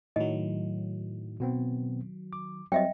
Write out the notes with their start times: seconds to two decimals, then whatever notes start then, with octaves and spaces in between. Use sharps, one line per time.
0.16 A2 D#3 F#3 D#5
1.40 B2 B3 C4
2.33 D6
2.72 F#3 G3 C4 D#5 E5 G5